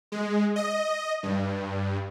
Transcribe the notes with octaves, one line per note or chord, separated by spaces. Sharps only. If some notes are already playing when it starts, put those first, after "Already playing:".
G#3
D#5
G2